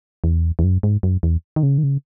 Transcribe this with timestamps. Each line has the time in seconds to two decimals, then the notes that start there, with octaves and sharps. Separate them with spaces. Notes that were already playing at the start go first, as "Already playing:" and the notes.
0.24 E2
0.59 E2
0.64 F#2
0.83 G#2
1.03 F#2
1.23 E2
1.56 D#3
1.63 C#3
1.78 D#3
1.83 C#3